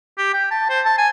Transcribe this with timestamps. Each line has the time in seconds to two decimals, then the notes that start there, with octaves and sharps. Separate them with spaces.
0.18 G4
0.33 G5
0.51 A5
0.69 C5
0.85 A5
0.98 G#5